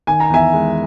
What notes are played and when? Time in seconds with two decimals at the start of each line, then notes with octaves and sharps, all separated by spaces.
0.07 D#3 G#5
0.20 A#5
0.30 E2 E5 G#5
0.53 G#3